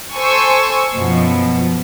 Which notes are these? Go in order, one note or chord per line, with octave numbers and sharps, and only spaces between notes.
A4 C5 G#5 C#6 E6
F#2 B2 F3